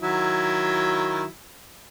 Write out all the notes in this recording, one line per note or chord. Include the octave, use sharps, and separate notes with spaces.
D#3 F#3 E4